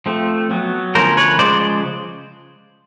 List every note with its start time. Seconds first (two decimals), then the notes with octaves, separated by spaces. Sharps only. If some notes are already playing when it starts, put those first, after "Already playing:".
0.06 F3 A3 C4
0.51 F#3 B3
0.95 D3 F3 A3 C#4 A#4 C5
1.17 B4 C#5
1.39 C#3 F3 G#3 C5 D5